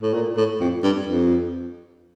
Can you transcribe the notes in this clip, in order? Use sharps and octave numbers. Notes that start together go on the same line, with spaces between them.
A2
A#2
A2
F2
G2
F2